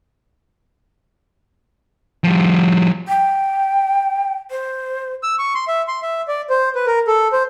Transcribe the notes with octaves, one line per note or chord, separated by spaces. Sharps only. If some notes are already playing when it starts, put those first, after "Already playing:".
F3 G3
G5
C5
E6
C#6
C6
E5
C6
E5
D5
C5
B4
A#4
A4
C5